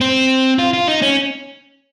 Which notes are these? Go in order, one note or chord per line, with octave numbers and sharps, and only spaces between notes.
C4
F4
F4
D#4
C#4